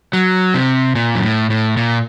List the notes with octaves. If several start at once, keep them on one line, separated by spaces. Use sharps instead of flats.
F#3
C3
A#2
F#2
A2
A2
A#2